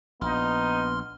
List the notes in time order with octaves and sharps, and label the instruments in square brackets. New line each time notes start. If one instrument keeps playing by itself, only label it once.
[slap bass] A#1 [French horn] B3 [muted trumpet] D#4 [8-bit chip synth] C6 F6